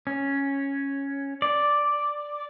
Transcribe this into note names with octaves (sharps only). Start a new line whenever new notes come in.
C#4
D5